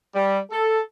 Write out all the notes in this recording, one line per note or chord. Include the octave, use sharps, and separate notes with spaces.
G3
A4